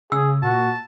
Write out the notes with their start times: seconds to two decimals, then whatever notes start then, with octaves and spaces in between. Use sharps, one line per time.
0.12 C#3 G#4 E6
0.43 A#2 F#4 A5